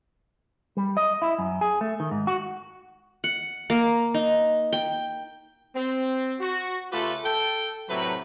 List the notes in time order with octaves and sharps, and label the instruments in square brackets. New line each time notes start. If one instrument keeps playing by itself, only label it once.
[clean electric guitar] G3
D#5
E4
F#2
G#4
A3
D#3
G#2
F#4
[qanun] F#5
A#3
D#4
G5
[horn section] C4
F#4
C#3 A3 F4 G4 A4 B4
A4 G5
A2 C3 F#3 A3 B4